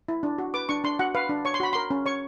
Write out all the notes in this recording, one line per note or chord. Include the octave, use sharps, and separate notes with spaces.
E4
D4
F#4
B4 D6
D4 C#6
D4 C6
F#4 F#5
B4 F5
D4
C#5 C#6
C6
F#4 B5
A#4 C6
C#4
C#5 C#6